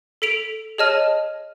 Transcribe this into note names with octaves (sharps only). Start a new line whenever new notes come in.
A4 B6 D7 F7
G#4 C#5 D#5 A5 F6 D#7